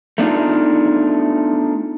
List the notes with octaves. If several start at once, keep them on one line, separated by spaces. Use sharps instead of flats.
A3 B3 D4 D#4 F4